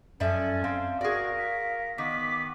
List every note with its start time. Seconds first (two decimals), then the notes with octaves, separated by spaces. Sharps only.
0.20 F#2 F3 C#4 A4 D5 E5
0.64 C4 F5 C6
1.01 F#4 G#4 A#4 D5
1.38 B6
1.98 D#3 B3 D6 B6